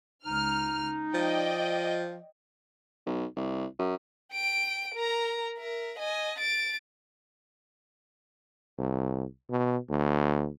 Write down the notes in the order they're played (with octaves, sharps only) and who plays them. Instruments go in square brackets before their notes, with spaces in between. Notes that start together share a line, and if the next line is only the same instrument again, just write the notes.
[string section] C#2 F6 [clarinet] D#4
[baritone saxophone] F3 [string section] D5 D#5 G5
[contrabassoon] B1
C2
F#2
[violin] G5 D7
A#4 A#5
A#4 E5
D#5 G#5
A6 D7
[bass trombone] C2
B2
D2